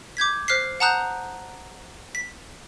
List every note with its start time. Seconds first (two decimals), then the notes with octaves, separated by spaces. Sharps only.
0.17 D6 G6 G#6 B6
0.48 C5 F6 F#6 B6 C7
0.80 F#5 A5 A#5 D#6 F#6 G6
2.15 B6